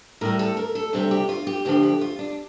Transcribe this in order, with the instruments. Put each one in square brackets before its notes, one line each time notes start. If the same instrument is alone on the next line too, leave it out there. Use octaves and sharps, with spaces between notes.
[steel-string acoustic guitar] A2 G3 A#4
A4
A#4
A4
D2 C3 G3 G4
G4
F4
G4
D2 D3 F3 G4
G4
F4
D4